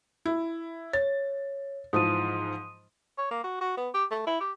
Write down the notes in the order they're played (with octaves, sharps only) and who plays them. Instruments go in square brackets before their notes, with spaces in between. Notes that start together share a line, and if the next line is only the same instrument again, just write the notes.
[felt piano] E4
[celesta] C#5 [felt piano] A6
[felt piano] G#2 E3 F3 [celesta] D#6 D#7
[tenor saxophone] C#5
A#3
F#4
F#4
B3
G4
A3
E4
G4